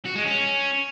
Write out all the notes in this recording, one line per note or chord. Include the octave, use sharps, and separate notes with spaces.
F#4
G#3
C#4